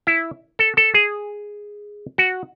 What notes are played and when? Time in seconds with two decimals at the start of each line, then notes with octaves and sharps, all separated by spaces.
0.07 E4
0.59 A4
0.77 A4
0.94 G#4
2.18 F#4